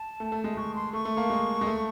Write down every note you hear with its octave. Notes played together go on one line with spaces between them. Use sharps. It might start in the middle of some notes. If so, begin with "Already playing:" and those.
Already playing: A5
A3
A3
G#3
G#3 C#6
C6
A3 C#6
A3
A#3
G#3
G#3
A3